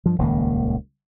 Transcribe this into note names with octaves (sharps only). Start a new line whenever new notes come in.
G2 F3
D#1 C#2 D#3 A#3